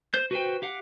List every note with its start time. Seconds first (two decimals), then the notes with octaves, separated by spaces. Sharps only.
0.14 C5 G6
0.31 F#4 B4 C5 G5
0.62 G4 F5 F#5